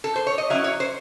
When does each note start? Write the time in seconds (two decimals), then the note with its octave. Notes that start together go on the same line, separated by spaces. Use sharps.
0.04 A4
0.16 C5
0.27 C#5
0.38 D#5
0.50 F#3 C#4 E4 E5
0.64 C#5
0.80 C5